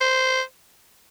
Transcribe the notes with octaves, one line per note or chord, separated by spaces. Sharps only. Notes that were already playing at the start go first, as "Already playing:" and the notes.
C5